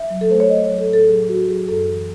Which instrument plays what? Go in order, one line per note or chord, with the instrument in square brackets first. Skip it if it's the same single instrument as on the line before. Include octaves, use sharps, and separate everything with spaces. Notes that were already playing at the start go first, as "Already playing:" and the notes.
Already playing: [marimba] E5
F#3
A4
A3 C5
C#5
A3 D#5
F#3 C#5
A4
A2 A4
F#3 G#4
F#3 F#4
F#3 G#4
F#2 A4
E3